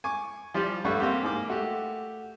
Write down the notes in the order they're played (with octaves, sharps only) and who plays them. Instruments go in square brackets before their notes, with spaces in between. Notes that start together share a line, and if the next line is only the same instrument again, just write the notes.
[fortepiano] G#5 C#6 D6
F3 G3 F4 G4 D5
G2 G3 A3 B4 F#5 C#6
A#3 C4 G4
G#2 A#3 D6
A3 F#4 G4